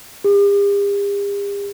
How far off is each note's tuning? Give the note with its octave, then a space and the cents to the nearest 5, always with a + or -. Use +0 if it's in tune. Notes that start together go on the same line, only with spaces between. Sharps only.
G4 +45